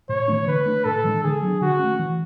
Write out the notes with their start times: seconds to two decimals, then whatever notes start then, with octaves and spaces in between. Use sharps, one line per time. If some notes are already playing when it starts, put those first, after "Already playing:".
0.09 A2 C#5
0.28 E3 A3 D4
0.47 D3 B4
0.66 A3 D4
0.85 A2 A4
1.04 E3 G#3 D4
1.23 D3 G#4
1.42 F#3 B3 D4
1.61 D3 F#4
1.80 A3 C#4
1.99 E3